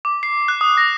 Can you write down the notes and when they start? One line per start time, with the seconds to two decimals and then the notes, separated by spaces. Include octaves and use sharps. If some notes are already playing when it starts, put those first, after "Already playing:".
0.05 D6
0.23 C7
0.48 F#6
0.61 D#6
0.77 A#6